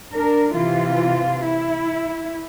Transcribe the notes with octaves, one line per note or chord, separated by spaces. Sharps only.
D4 A#4
C3 E3 F4
E4